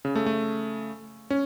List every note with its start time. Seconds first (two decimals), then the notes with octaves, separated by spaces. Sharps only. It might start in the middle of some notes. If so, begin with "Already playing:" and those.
0.05 C#3
0.15 A3
0.26 A3
1.30 C#4